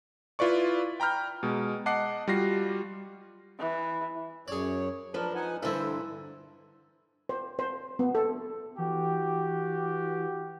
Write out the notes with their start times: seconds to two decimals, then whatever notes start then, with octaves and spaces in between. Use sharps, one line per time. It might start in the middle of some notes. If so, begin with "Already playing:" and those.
0.39 E4 F4 B4 D5 C#6
1.00 G5 A#5 B5 F6 G6
1.43 B2 G#3
1.86 D#5 F#5 A5 D6 F#6 C7
2.28 G3 F4 F#4 A#6 C7
3.59 E3
4.48 F#2 G#4 C#5 D5
5.14 F3 D4 A#4 B4
5.35 D#4 F#5 G#5
5.63 G2 D3 E3 E4 A4 C5
7.29 C5
7.59 C5
7.99 B3
8.15 A4
8.78 E3 F#4 G4